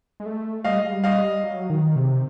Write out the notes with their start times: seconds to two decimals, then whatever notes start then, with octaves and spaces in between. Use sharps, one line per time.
0.20 G#3
0.26 A3
0.64 G3 D#5 F5
0.79 G#3
0.93 G3
1.04 D#5 F5
1.44 F#3
1.70 D#3
1.96 C3